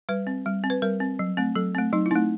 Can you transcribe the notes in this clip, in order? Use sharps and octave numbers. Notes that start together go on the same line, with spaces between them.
G3 B4
C4
G3
C4
B4
G3 A#4
C4
F#3
A3 C4
F#3 A4
A3 C4
F#3 D#4
E4
A3 C4 D#4